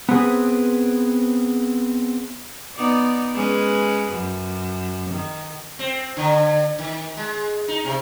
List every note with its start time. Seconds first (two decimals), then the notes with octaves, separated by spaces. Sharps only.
0.09 B3 C4 G#4 B4
2.75 B3 D#4 D5
3.35 G#3 C#4 B4
4.11 F#2
5.09 D#3
5.79 C4
6.17 D3
6.79 D#3
7.17 G#3
7.68 D#4
7.85 C3